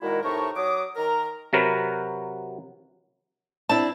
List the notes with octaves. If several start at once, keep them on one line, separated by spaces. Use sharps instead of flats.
A#2 D#3 G#3 E4 F#4 A#4
A2 C3 D#4 A#4 A5 C#6
F#3 D6 D#6
D#3 A#4 A#5
C3 F#3 F#4 A#4 B4
C4 D4 E4 A5